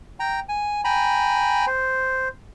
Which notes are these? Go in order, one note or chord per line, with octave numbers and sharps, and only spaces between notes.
G5 A#5
G#5
G5 G#5 A#5 B5
C5